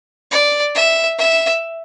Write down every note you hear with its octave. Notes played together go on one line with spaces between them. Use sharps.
D5
E5
E5